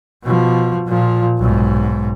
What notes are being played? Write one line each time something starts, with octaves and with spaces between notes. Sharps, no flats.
B2 F3
A#2 F3
B1 G#2